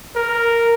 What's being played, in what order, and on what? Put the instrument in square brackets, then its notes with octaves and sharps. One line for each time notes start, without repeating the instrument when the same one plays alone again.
[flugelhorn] A#4